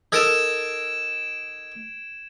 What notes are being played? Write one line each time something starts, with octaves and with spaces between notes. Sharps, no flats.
D#4 A4 A#4 G#6 D7 E7